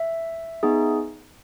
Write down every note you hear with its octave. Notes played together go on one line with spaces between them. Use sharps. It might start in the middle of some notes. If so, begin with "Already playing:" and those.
Already playing: E5
B3 D#4 G#4